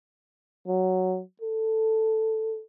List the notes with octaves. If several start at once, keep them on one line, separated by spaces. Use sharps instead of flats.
F#3
A4